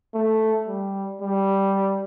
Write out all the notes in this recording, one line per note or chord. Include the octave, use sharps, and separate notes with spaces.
A3
G3
G3